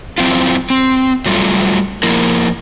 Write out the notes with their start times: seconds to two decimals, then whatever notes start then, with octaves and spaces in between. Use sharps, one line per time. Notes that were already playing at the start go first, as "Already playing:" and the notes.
0.18 F#3 C4 E4 F4
0.70 C4
1.26 F#3 G3 A3 F4
2.03 F3 A#3 E4 A#4